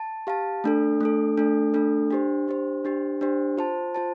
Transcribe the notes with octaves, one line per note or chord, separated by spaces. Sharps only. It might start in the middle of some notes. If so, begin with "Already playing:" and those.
Already playing: A5
G4 F5 A5
A3 D4 A4
A3 D4 A4
A3 D4 A4
A3 D4 A4
D4 G4 C5
D4 G4 C5
D4 G4 C5
D4 G4 C5
F4 C5 A5
F4 C5 A5